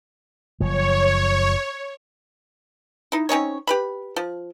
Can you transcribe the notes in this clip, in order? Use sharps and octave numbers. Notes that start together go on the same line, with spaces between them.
F#1 F3 C#5
D#4 E4
C4 C#4 D#4 C#5
G4 B4 B5
F3